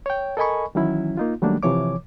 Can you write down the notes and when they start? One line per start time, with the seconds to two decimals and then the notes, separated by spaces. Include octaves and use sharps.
0.06 C#5 G5
0.37 A4 A#4 D#5 G#5 B5 C#6
0.75 D#3 E3 F#3 C#4 E4
1.17 A#3 D#4 F4
1.42 D#3 F#3 G3 A3 A#3 D4
1.63 C3 E3 F3 C#5 D6